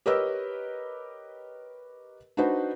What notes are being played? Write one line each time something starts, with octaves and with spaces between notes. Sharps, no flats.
G4 A#4 B4 C#5 D#5 E6
D4 D#4 F#4 B4 C5